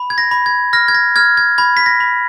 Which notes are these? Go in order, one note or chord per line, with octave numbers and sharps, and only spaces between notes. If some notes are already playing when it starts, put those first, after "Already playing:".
Already playing: B5
G#6
A#6
B5
G#6
F6 A#6
G#6
A#6
F6 G#6
G#6
B5 G#6
B6
A#6
B5